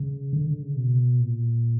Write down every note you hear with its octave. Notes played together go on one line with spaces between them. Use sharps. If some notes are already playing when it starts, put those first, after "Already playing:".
Already playing: C#3
D3
D3
C#3
B2
A#2